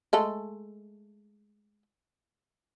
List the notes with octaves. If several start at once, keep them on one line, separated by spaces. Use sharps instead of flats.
G#3 A3 A4